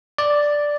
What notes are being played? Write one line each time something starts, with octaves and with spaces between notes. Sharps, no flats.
D5